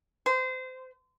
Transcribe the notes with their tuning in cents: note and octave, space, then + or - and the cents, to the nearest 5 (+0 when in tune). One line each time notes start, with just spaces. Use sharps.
C5 -25